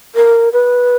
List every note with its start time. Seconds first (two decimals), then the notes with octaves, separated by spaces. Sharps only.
0.15 A#4
0.53 B4